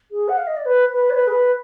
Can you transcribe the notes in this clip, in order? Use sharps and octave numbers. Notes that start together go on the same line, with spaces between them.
G#4
F#5
F5
D#5
D5
B4
B4
D5
B4
G#4
B4